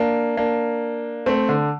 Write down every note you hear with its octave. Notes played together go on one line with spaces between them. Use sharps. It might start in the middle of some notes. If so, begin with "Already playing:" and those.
Already playing: A#3 D4
A#3 D4
A3 C4
D3